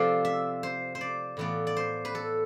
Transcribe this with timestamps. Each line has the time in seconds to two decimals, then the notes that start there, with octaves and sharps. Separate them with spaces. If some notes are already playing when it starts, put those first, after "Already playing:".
Already playing: C3 F3 C4 F4 A4 C5 D5
0.25 E5
0.63 C5
0.95 C5
1.01 D5
1.37 A2 E3 B3 F4 D5
1.67 D5
1.77 C5
2.05 B4
2.15 A4